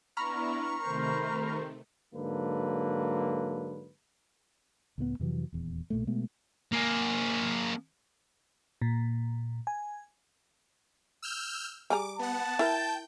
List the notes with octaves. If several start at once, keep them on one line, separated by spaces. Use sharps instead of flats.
B3 D4 E4 A#5 B5 C#6 F6
C3 D#3 A3 A#4 C5
G#2 D3 F#3 A#3 B4
C#2 A2 G#3 B3
F2 C3 E3 F#3
D#1 E2
B1 A#2 A3
B2 G#3 A3 B3
A#3 G#4
A#2
G#5
E6 F6 G6
G3 G#4 A#5 D6
B3 F#5 A5
E4 A#4 G5 G6